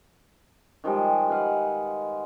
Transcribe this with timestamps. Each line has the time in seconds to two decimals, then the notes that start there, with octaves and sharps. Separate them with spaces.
0.84 D#3 F3 G3 G#3
1.29 G#4 B4 F5 F#5